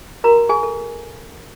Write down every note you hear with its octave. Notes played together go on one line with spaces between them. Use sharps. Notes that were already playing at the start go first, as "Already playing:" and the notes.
F#4 A#4 A#5
G#4 G#5
A4